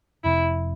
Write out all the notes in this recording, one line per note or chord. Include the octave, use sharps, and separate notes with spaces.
F1 F2 C3 E4